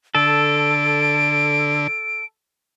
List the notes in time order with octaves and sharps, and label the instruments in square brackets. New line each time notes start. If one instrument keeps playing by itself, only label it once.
[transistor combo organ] D3 [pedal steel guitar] A4 [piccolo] D7